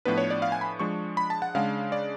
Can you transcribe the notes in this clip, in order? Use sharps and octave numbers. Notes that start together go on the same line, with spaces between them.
A2 F3 B3 D4 B4
C#5
D5
F5
G#5
B5
F3 G#3 D4 C#6
B5
A5
F#5
C#3 G#3 D4 F5
D5